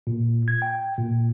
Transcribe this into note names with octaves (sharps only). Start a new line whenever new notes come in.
A#2
G#6
G5
A#2